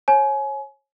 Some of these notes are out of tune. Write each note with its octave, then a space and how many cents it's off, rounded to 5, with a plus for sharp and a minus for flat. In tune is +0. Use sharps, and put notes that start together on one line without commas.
C#5 -30 G#5 +30